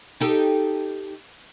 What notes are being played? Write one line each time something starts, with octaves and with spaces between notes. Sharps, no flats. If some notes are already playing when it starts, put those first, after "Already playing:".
D#4 G4 A4